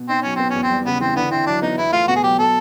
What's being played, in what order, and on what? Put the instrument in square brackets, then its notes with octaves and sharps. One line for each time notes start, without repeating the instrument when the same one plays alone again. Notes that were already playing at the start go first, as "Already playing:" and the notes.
Already playing: [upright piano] B2
[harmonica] C4 [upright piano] D#4
[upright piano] F#3 [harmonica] C#4
[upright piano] B3 [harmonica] C4
[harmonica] C#4
[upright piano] E2
[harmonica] C4
[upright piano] G3
[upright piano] C#3 [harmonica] B3
[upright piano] E3 [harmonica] C4
[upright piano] D3 [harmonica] B3
[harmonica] C4 [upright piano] E4
[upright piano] F#3 [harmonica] D4
[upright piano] B3 [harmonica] D#4
[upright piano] E2 [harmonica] E4
[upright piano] A3 [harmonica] F4
[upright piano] B2 [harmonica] F#4
[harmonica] G#4
[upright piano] F#3 [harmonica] G4
[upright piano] B2 [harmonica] A4